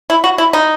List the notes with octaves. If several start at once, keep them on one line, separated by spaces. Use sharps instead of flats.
E4
F#4
E4
D#4